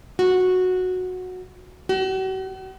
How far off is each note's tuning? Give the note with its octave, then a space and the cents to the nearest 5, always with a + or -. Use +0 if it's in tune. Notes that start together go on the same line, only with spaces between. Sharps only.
F#4 -10
F#4 +45